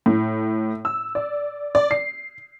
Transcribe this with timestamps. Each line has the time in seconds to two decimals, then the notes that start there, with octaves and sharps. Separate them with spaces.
0.06 A2
0.85 E6
1.15 D5
1.75 D5
1.91 C7